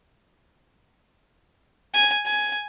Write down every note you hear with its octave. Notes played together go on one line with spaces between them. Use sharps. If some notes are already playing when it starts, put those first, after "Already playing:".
G#5
G#5